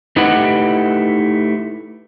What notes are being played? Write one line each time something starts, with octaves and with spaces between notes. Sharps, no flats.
A3 D#4 E4 G4 B4 F#5